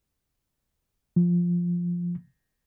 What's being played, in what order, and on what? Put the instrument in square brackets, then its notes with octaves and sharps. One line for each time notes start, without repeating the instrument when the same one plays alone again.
[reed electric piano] F3